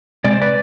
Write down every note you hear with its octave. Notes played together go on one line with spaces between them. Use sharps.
C3 G#3 C4 D5
C5
B4 D5